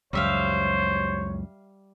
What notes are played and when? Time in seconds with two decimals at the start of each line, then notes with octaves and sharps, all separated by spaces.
0.13 C#2 F#2 G3 C5 C#5 E5 F5